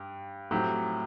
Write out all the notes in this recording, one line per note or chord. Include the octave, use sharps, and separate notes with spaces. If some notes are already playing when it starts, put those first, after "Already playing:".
Already playing: G2
A2 F#3 C4 G4